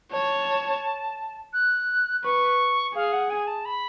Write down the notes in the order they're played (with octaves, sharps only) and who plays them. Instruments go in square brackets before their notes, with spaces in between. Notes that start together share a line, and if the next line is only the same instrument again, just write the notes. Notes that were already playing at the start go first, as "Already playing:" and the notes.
[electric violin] C#5 [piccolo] A5
[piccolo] F#6
[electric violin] B4 [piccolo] C#6
[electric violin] G#4 [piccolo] F5
[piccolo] F#5
G#5
A5
B5